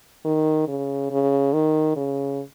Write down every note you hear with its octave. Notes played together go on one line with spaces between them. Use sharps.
D#3
C#3
C#3
D#3
C#3